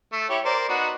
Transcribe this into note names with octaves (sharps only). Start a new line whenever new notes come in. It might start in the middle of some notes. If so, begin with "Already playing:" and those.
A3
E4 G4 C#5
A#4 C5 D5
B3 D#4 F#4